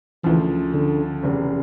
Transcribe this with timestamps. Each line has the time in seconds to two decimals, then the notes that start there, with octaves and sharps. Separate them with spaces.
0.24 D2 C#3 E3 F3
0.74 D3
1.22 F1 E2 C#3